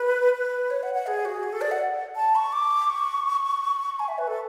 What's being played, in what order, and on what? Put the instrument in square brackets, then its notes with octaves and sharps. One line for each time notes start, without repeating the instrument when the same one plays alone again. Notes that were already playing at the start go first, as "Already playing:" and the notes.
Already playing: [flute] B4
B4
C#5
F#5
F#5
G#4
F#4
G#4
A4
D5
F#5
A5
C#6
D6
C#6
G#5
E5
B4
A4